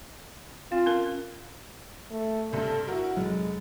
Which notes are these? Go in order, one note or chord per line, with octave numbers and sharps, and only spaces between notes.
C4 F4
C#4 A#4
A3
G2 C3 A4
E4 F#4 A#4
F1 F#3 G#3